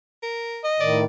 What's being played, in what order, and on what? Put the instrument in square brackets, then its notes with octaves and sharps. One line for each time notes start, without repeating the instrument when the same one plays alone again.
[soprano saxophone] A#4
[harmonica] D#5
[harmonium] A2 D#3 [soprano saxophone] D5